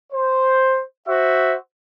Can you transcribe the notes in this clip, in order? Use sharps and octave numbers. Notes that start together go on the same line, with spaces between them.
C5
F#4 C5 E5